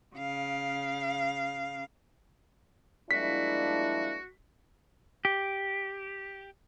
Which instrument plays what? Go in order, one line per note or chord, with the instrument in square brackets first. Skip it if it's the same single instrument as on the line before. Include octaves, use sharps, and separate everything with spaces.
[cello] C#3 F5
[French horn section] F3 G3 E4 [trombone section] G#3 A#3 D4 [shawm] F#4 [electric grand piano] B6
[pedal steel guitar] G4